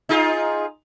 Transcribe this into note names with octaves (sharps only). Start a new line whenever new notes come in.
D#4 F4 G#4